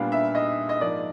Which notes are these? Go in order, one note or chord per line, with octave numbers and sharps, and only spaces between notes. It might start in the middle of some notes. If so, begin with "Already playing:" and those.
Already playing: A#2 G3 B3 D4 F5
E5
D#5
D#5
G#2 F3 A#3 D5